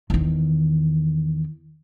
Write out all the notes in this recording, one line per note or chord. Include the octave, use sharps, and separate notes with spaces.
E2 D#3